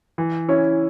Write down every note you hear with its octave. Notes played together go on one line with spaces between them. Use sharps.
E3
C#4 E4 C#5